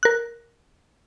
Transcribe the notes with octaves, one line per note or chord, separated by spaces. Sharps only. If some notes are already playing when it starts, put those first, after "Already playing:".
A#4 F#6